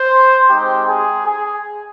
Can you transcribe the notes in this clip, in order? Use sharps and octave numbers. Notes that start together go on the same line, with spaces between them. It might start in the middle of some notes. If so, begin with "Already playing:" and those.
Already playing: C5
G#3 C4 D#4 G4
G#4
G#4